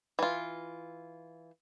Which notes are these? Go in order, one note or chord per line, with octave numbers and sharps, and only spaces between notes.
E3 F4